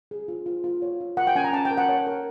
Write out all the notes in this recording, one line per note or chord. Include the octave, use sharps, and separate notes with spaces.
G#4
F4
F4
F4
C#5
F4
A#4 F#5
G5
C#4 G#5
A#5
C#4 A5
G5
A#4
F#5
C#5
A#4